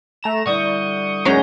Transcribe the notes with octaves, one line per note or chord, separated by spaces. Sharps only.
A3 A#5 E7
D3 G3 E4 C#6 D#6 G6
D2 G#2 F#3 G#3 A3 C#4 G6 A#6